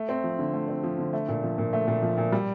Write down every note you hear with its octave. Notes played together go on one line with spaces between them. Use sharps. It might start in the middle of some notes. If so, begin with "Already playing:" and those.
Already playing: A3
C4
F3
D3
A3
C4
F3
D3
A3
A#2
F3
A#2
A3
A#2
F3
A#2
G3